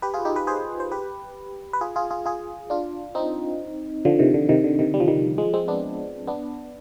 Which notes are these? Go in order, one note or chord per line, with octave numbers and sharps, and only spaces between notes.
G4 B4
F4 G#4
D#4 G4
G4 B4
G#4 C5
C5
G4 B4
B4
F4 G#4
F4 G#4
F4 G#4
F4 G#4
D4 F4
C4 D#4
D3 F3
C3 D#3
D3
C3 D#3
D3
C3 D#3
G3
F3
D#3 G3
F3 G#3
G#3 C4
B3 D4
B3 D4